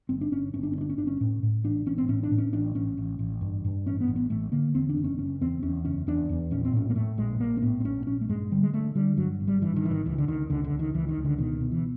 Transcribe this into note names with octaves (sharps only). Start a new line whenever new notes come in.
G1 C4
D4
G1 C#4
G1 C#4
D4
C#4
G2
D4
C#4
G1 D4
C#4
A2
A2
A1 D4
A1 C#4
C4
A2 C#4
D4
A2
C#4
A1 D4
A1 C#4
A1
A1
G2
G2
A1 C#4
B3
A1
B3
A1 A3
D3 A#3
E2 C4
D4
F#1
C#4
F#1 C#4
E2 C4
E2 C#4
F#1 C#4
E2 D4
E2
A#1 C#4
C4
A2 C#4
A#3
A2 A3
A#1 G#3
A#1 A#3
C4
A2 B3
C4
A#1 C#4
A#1 C#4
A3
G2 G#3
D3 G3
G#3
D3 A3
D3 G3
G2 F#3
G#1
G3
G2 E3
D#3
G#1 E3
D#3
C#2 E3
D3
C#2 D#3
C#2 D3
D3
C#2
D#3
C#2 E3
D#3
C#2
D3
B2 D#3
B2
E3